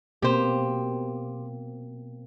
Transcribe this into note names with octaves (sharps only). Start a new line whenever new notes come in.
B2 A#3 C4 G4 C5